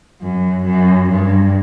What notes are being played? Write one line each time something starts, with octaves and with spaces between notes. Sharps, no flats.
F#2
F#2
G2